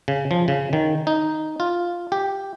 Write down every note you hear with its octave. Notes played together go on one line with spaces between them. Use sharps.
C#3
F3
C#3
D#3
D#4
F4
G4